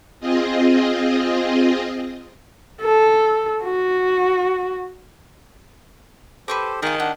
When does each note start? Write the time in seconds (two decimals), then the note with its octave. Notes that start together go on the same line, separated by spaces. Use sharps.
0.20 C4 F4 G#4 D#5
2.81 A4
3.63 F#4
6.48 G4 A4 B4 C5 C#6 D6
6.82 D#3 D#4 F4 G#4 D#5 D#6
7.00 D4 F#5